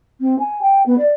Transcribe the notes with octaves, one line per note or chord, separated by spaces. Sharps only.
C4
G#5
G5
B3
D5